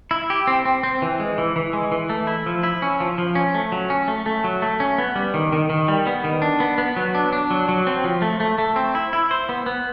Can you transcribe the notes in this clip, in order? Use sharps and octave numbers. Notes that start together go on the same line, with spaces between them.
E4
G4
C4
C4
C4
E3
G#3
E3
E3
G#3
E3
A3
E4
F3
E4
C#4
F3
F3
C#4
A3
F#3
C#4
A3
A3
F#3
A3
C#4
B3
G3
D#3
D#3
D#3
G3
B3
D#3
D4
B3
B3
F#3
D4
D4
F#3
F#3
C4
F3
A3
A3
A3
C4
E4
E4
C5
B3
B3